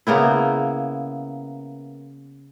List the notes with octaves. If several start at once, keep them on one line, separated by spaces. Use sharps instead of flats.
C#3 A#3 B3 E4